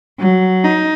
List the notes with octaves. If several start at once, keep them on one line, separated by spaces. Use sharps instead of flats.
F#3
D#4